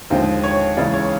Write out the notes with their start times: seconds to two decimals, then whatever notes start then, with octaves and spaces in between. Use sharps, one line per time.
0.10 D#2 D3 F3 G#3 C5
0.44 C#5
0.77 C#2 C#3 E3 G#3 D5
0.93 C#5